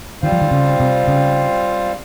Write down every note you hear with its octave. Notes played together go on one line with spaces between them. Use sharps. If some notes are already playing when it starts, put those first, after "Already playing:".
D#3 G3 C4 F4 C5 F5
F3
D#3
C#3
C3
C#3